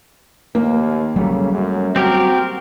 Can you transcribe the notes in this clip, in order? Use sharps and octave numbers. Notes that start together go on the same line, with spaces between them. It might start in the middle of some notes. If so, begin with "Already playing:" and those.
D#2 A#3
C#3 F#3 G3 A3
F#2
C4 F#4 G4 A#4